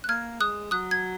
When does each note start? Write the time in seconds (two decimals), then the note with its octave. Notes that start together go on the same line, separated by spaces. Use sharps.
0.04 F#6
0.09 A#3 F6 G#6
0.40 G#3 D#6 F#6
0.71 F#3 D#6 F#6
0.91 G#6